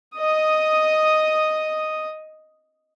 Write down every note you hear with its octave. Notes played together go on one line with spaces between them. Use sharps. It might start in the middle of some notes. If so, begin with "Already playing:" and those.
D#5 D#6